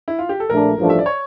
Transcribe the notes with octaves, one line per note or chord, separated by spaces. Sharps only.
E4
F4
G4
A4
A#1 A#2 A3 D4 A#4
A1 G2 F3 A3 D4
E5
D5
C#5